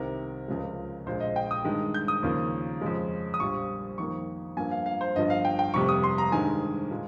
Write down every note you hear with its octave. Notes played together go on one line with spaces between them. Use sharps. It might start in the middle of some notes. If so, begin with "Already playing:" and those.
Already playing: C2 C3 D#3 A#4
C#2 C#3 F3 G#3
A#1 A#2 G#3 C5
D#5
G5
D#6
G2 D#3 G#3
G6
D#6
D#2 C#3 F3 A#3
F2 C#3 G#3
D#6
A#1 A#2 G3 C#6
F2 D#3 A#3 C#6
G2 F3 A#3 G#5
F5
F5
C5
G1 G2 F3 D#5
F5
G5
G5
F1 F2 C3 G3 C#6
D#6
C6
A#5
G2 D#3 G#3 G#5
A#2 G#3